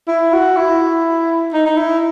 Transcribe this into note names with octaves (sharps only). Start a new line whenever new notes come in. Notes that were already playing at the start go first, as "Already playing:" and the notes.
E4
F#4
E4
D#4
D#4
E4